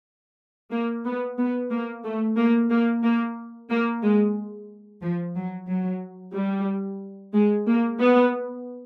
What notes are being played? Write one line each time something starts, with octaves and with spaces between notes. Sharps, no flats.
A#3
B3
B3
A#3
A3
A#3
A#3
A#3
A#3
G#3
F3
F#3
F#3
G3
G#3
A#3
B3